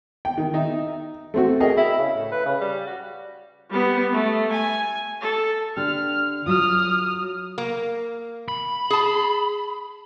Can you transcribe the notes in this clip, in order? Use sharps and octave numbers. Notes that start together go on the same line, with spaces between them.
G5
D#3
D#4 E5
A3 C4 F#4
G#4 A#4 D#5 G5
E4
C#3
A2
B4
C#3
G3
F#4
G3 B3
A3
G#5
A4
D3 D4 G4 F6
F#3 F4 D#6 F6
A#3
B5
G#4 A5